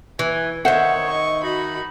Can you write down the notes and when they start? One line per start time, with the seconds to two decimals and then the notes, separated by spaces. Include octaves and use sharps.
0.19 E3 G#5
0.65 D#3 C5 C#5 E5 F#5
1.07 D#5 C#6
1.43 D#4 F#4 B5